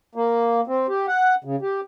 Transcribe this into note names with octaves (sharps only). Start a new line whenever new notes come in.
A#3
C4
G4
F#5
C#3
G4